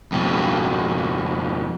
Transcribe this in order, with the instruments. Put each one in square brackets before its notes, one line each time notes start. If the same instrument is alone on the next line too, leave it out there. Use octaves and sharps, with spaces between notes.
[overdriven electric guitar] F2 B2